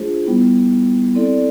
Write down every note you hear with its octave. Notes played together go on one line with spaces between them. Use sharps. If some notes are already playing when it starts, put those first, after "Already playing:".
Already playing: A3 D4 F4 G#4 C5
G3 B3 E4
C4 E4 A4 D5